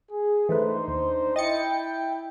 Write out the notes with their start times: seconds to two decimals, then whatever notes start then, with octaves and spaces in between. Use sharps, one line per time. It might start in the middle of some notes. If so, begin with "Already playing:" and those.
0.11 G#4
0.49 E3 A3 D4 D#4 B4 C5
0.88 D#2
1.36 E4 D#5 G5 A6 C#7